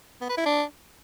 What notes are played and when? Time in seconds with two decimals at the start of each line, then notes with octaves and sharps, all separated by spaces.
0.21 B3
0.29 B4
0.37 E4
0.46 D4